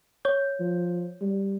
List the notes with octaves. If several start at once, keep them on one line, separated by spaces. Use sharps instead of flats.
C#5 G6
F3
G3